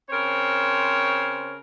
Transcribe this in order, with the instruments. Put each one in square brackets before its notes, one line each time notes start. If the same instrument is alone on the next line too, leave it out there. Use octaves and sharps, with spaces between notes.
[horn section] C#3 C4 A#4 C5 C#5